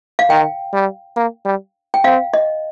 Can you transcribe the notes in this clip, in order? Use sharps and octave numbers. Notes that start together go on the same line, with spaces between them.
F5
D#3 G5
G3
A#3
G3
G5
C4 F5
D#5